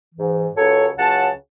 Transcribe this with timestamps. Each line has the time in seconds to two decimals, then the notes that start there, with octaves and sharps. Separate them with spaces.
0.14 E3
0.19 G#2
0.56 C#2 C#3 F#3 A4 C#5
0.97 C#2 C#3 F#3 F#5 A5